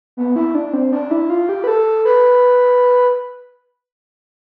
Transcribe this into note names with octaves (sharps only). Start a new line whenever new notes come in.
B3
E4
D4
C4
D4
E4
F4
G4
B4
A4
B4